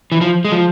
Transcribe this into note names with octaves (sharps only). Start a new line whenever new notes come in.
E3
F3
G#3
F3